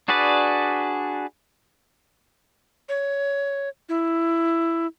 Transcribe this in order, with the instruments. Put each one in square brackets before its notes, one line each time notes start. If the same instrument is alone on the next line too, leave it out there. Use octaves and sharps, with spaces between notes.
[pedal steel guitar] D4 F#4 G#4 B4 D5
[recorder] C#5
E4